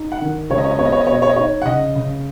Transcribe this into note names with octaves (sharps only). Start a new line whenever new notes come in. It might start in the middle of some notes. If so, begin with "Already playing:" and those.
Already playing: D#4
F#5
D#3
C#2 C#5
D#5
C#5
D#5
B3 C#5
D#5
C#5
D#5
B2 C#5
D#5
C#5
D#5
D#4 C#5
F#5
C#3 D#5
C#3